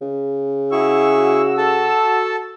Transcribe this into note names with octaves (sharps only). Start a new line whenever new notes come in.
C#3
E4 F#4 G#4 C#6 E6
A4 A5